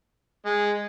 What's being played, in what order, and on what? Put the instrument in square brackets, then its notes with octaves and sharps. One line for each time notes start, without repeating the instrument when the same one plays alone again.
[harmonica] G#3